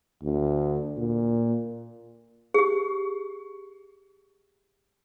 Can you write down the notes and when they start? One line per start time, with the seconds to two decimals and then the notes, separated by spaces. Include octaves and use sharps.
0.23 D2
0.97 A#2
2.54 G4 G#4